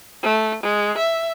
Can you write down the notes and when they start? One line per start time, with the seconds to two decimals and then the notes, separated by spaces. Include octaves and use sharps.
0.23 A3
0.63 G#3
0.98 E5